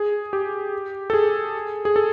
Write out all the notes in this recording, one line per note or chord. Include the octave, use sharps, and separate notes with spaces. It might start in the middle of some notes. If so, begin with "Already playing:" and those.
Already playing: G#4
G4
A4
G#4
G#4
A4